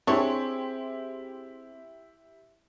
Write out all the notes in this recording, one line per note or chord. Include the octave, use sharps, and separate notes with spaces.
C4 D4 E4 G4 G#4 C#5 C6